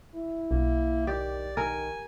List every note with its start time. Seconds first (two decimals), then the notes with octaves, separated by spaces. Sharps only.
0.15 E4
0.51 B1 A#3
1.07 D#3 G4 D5
1.57 D#3 A#4 G#5